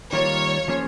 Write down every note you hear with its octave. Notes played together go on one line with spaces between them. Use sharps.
D#3 G3 A#3 F4 A#4 C#5
F3 A#3 C#4 G#4 C5